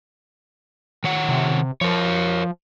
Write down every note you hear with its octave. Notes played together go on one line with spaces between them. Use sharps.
D#3 C#5 F#5
C3
F3 A#4 C#5